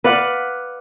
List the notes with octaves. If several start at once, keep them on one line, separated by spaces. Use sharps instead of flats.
B4 D5 F5 F#5